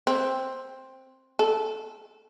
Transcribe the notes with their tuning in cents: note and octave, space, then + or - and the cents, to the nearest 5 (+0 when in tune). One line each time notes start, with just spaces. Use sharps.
C4 +10
A4 -10